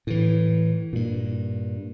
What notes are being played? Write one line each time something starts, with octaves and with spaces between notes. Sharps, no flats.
A2 E3
G2 A#2